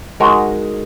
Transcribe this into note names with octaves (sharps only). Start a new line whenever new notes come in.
G#3 D#4 F#4 A#4